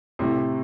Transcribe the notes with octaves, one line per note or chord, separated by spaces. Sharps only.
A2 C3